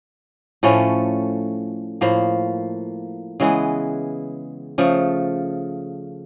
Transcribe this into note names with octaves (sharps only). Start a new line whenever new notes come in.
A2 F3 A3 C#4
A2 F3 A#3
C#3 E3 G#3 B3
C#3 F3 A3